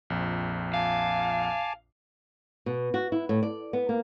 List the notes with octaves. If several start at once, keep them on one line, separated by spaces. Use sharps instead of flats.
A#1 F2
F5 G#5 A5 D6
B2
F#4
E4
A2
D5
B3
A#3